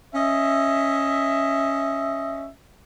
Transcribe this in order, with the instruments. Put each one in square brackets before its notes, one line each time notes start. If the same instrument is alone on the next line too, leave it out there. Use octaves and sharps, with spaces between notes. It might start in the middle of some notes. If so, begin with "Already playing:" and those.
[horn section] C#4 D#5 E5